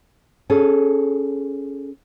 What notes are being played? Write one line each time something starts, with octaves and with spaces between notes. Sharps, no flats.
C#4 G#4 A4